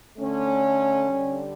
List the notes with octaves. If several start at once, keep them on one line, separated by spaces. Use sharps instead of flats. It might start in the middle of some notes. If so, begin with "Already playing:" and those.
D3 A3 C#4
D3 G3